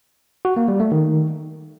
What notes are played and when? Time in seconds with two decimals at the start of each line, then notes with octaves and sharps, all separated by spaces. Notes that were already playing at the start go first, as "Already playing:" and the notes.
0.45 F#4
0.57 A#3
0.68 G3
0.80 A3
0.92 D#3